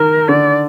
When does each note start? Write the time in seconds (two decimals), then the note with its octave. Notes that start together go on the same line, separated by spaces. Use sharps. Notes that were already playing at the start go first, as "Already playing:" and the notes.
Already playing: D#3 A#4
0.28 D3 D5